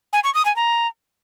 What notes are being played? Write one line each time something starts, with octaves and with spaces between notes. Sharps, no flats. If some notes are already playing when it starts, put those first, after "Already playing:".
G#5
C#6
D#6
G#5
A#5